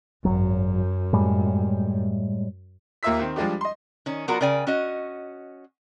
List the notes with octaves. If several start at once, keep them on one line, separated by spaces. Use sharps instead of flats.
G#1 C#2 F#2 F#3
A2 G3 G#3
D#2 A#3 F4 E5 E6 B6
D#3 C4
F3 G3 G#3 D4 G4
D#5 C6
D#3 C#4
F#3 B3 F4 F#4 A#4
C#3 A#4 D5 G5 G#5
C#4 F#4 D#5